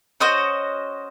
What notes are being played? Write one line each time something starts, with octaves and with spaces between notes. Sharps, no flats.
C#4 F#4 C5 D#5